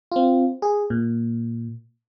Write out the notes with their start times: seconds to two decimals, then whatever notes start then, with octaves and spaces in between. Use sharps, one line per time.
0.12 C4 F4
0.62 G#4
0.90 A#2